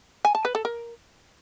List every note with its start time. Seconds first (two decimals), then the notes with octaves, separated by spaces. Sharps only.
0.25 G#5
0.35 A5
0.45 B4
0.55 A4
0.65 A#4